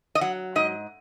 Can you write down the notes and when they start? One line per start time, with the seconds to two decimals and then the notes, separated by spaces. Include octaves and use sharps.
0.15 D#5
0.21 F#3 F#5
0.56 G#2 D#5